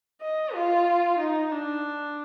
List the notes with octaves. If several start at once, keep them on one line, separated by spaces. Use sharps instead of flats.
D#5
F4
D#4
D4